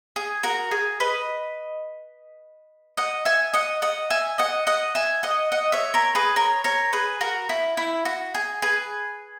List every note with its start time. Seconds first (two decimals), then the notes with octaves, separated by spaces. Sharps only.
0.16 G#4
0.43 F#4 A#4
0.71 G#4
1.00 B4 D#5
2.97 D#5 F#5
3.25 E5 G#5
3.54 D#5 F#5
3.82 D#5 F#5
4.10 E5 G#5
4.38 D#5 F#5
4.67 D#5 F#5
4.95 E5 G#5
5.23 D#5 F#5
5.52 D#5 F#5
5.72 C#5 E5
5.94 A#4 C#5
6.15 G#4 B4
6.36 A#4 C#5
6.64 A#4 C#5
6.93 G#4 B4
7.21 F#4 A#4
7.49 E4
7.77 E4
8.05 F#4
8.34 G#4
8.62 G#4 B4